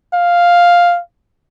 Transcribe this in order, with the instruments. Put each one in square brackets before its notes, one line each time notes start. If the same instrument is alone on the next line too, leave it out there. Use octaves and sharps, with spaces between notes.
[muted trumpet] F5